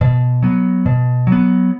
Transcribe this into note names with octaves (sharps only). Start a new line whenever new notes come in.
B2
F#3 B3
B2
F#3
B3